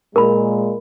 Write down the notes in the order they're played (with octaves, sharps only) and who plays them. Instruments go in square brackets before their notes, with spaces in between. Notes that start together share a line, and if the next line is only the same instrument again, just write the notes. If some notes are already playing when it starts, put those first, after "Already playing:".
[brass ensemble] A#2 G#3 [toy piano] A#4 B5